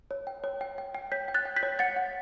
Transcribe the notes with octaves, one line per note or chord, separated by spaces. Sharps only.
C#5
G5
C#5
G5
G5
G5
C#5 G6 B6
G5
F#6 A6
G5
G6 B6
C#5
F#5 A6 C#7
F#5